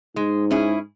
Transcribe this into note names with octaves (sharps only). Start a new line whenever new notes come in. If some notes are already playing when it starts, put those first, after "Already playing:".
G#2 G#3
C#4 E4 G#4